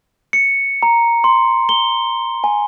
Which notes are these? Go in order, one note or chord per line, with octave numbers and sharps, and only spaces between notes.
C#7
A#5
C6
G7
G#5